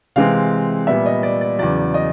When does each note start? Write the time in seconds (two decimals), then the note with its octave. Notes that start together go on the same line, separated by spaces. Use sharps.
0.16 C3 E3 G#3 C4 F5
0.87 A#2 G3 B3 E5
1.06 D#5
1.23 D5
1.41 D5
1.58 E2 C#3 F#3 D5
1.94 D#5